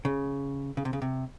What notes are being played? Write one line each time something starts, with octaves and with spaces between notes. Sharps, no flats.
C#3
C#3
C3
C#3
C3